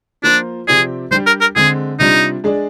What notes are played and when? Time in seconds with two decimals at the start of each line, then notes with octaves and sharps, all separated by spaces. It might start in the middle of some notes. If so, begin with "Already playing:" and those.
0.23 F3 A#3 D4 F4 C5
0.67 C3 F3 C4 G4 G#4 D5
1.11 G3 D4 G4 C5
1.27 A#4
1.41 A#4
1.56 D3 G#3 C4 G#4
1.99 C3 G3 D4 D#4 F4
2.44 G#3 D4 G#4 D5